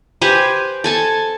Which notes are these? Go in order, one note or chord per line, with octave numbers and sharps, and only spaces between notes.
G4 B4 C5 G#5
A4 G#5 A5